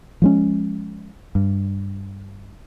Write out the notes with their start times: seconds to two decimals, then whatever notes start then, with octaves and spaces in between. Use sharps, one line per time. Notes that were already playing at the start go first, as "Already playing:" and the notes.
0.22 F3 G#3 C#4
1.35 G2